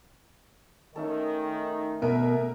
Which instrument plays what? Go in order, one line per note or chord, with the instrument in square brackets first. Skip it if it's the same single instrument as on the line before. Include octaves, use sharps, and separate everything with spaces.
[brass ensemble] D#3 [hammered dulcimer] A3 C#4 A4
[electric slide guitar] B2 [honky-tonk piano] A#4 E5